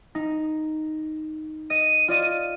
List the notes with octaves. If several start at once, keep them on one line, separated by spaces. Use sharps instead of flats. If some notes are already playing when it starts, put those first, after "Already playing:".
D#4
D#5 D#7
F4 D5 D#5